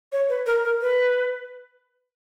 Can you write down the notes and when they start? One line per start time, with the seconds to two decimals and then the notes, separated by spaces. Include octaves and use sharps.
0.12 C#5
0.29 B4
0.46 A#4
0.65 A#4
0.81 B4